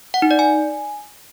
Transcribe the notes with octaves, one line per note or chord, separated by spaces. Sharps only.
F#5
D#4
D5
G#5